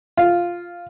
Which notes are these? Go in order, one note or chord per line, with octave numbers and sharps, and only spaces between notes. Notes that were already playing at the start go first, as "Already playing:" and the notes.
F4